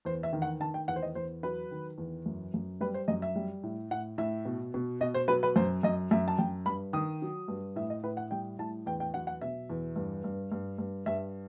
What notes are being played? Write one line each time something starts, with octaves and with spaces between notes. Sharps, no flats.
E2 C5
E5
D#3
F#5
D#3 A5
G5
E2 F#5
C5
D#5
E2 C5
F#3 B4
D#3
E2
F#2
F#2
G3 B4
C5
F#2 D#5
E5
G3
A2
A2 F#5
A2 E5
B2
B2
B2 D#5
C5
F#3 B4
B4
F#2 C5
F#2 D#5
F#2 E5
A5
F#2 G5
G2 B5
D#3 D#6
F#3
G2
A2 E5
D#5
A2 B4
F#5
G3 G5
A2 A5
E2 G5
G5
F#3 F#5
F#5
B2 E5
E2
G2
G2
G2
G2
G2 E5